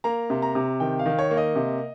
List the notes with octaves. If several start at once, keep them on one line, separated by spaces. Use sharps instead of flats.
A#3 A#5
C3
A#5
C3
D#3 G5
F5
D#3
C#5
A#3
D#5
C3